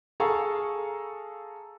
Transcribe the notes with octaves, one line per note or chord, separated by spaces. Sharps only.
G#4 A4 F5 A#5 C#6